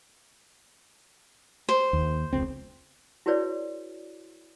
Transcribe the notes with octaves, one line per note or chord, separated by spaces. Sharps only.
C5
D#2
F1 C#2 C4
E4 F#4 G#4 B4 C#5 D5